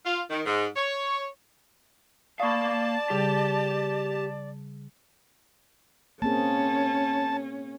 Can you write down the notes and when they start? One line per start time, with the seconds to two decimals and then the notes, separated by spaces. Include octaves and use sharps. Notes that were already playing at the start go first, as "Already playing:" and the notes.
0.05 F4
0.30 D#3
0.46 G#2
0.76 C#5
2.40 A#3 D5 F5 A5 B5 C#6 D#6
3.10 C#3 G3 G4 G#4
6.22 A#3 C4 C#4 G#4 A5